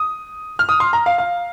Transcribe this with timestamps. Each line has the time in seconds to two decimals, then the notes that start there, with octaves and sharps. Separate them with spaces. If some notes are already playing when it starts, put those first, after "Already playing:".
Already playing: D#6
0.59 F6
0.69 D#6
0.80 C6
0.93 A#5
1.06 F5
1.18 F5